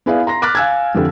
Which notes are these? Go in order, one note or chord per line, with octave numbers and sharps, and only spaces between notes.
B3 E4 G#4 B4 D5 F5
A#5 C6 A#6
D6 F6 F#6 A6 B6
F5 G#5 E6 F#6 G#6
F2 D3 E3 G4 A4